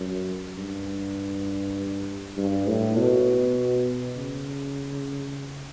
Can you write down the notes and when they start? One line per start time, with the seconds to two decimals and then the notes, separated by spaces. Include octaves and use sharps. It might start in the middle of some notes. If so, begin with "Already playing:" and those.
Already playing: F#2
0.57 G2
2.37 G2
2.67 A2
2.98 B2
4.16 C#3